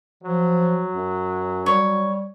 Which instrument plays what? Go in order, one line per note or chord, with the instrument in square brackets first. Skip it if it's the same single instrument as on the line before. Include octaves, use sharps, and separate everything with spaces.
[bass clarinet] F3 [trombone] F#3
[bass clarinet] F#2
[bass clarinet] G3 [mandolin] C#5